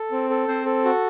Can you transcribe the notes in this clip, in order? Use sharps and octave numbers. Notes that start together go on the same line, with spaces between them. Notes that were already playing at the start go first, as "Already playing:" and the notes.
Already playing: A4
C4
A4
C4 C5
A4
F#4